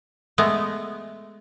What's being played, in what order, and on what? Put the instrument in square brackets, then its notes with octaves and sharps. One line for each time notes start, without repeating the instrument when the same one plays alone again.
[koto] G#3 A3 B3